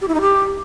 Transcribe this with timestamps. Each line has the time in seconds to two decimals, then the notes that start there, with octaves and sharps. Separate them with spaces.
0.01 G4
0.08 E4
0.15 D#4
0.21 G4